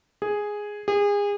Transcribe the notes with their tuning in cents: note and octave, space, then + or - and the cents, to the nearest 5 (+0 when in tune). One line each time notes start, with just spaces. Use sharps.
G#4 +0
G#4 -30